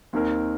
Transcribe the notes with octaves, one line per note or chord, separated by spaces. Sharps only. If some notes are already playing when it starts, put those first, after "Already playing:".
D#2 D#3 C4 D#4 A#4